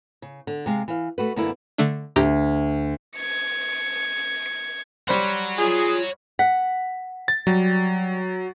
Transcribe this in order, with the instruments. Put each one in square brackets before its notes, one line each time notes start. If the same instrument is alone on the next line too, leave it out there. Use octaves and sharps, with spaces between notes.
[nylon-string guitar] C#3
D3
C3 G#3 F5
E3 F5
A3 F#4 B4
F#2 D3 A#3 B3 D4 E4
[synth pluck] D3 A3 D4
[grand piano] D2 [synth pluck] G4 A#5
[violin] G#6 C#7
[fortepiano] G3 C5 C6 [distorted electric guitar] C#5 F#5
[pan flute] F4 [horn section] G#4
[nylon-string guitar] F#5 [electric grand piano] B6
[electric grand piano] A6
[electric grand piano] F#3 [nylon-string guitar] G3